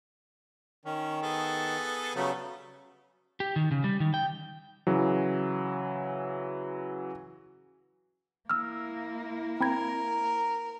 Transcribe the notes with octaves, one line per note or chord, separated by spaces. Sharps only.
D#3 C#4
B3 G#4 A4
C#3 F#3 G3 A3 B3
G4
D#3
C#3
G3
D#3
G5
C#3 E3 F#3
A#3 E4 E6 F6
C4 A#4 B5 G#6